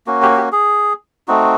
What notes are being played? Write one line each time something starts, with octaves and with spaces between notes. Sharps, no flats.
A#3 C#4 F#4
G4
G4
G#4
A3 C4 D#4 F#4